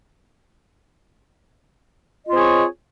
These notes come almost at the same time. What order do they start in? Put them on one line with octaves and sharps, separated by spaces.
D#5 F4 C4 G#4 C#5